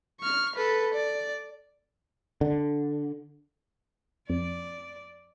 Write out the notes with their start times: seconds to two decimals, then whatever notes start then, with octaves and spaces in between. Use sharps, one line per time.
0.21 C#6 F6
0.56 A4 B4
0.94 D5
2.41 D3
4.30 F2 D5